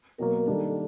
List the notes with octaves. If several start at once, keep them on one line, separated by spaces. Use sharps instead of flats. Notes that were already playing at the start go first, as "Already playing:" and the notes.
B2 F#3 A#3 A#4
D#3 G3 A#3 D4 A4